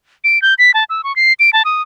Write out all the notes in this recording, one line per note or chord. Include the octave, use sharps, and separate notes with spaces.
D7
G6
B6
A5
E6
C#6
C7
D7
A5
D#6